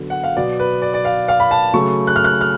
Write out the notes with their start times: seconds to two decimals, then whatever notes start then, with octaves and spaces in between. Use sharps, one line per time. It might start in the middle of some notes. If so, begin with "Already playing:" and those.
Already playing: D3 F#3 B3
0.10 F#5
0.24 F5
0.37 B2 F#3 B3 D5
0.59 B4
0.82 D5
0.94 D5
1.05 F5
1.28 F5
1.40 B5
1.51 A5
1.73 C#3 F#3 A3 C#6
2.07 F#6
2.16 F6
2.24 F#6
2.41 F6